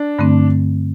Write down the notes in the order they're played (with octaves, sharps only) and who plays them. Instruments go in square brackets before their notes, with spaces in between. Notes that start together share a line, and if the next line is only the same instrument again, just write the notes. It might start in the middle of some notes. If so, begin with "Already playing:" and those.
Already playing: [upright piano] D4
[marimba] G2 D3 A3 C4